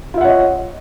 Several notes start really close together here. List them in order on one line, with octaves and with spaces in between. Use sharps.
F4 E5 F#5 C#5 D#5